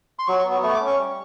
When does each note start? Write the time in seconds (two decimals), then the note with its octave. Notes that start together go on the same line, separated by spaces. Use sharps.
0.19 C6
0.27 F#3 C#6
0.39 C#6
0.45 B3
0.51 C#6
0.63 A3 C#6
0.74 D6
0.80 C#4
0.87 C#6
0.98 G3